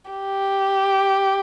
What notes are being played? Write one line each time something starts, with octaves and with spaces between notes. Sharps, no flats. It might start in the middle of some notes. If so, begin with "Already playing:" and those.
G4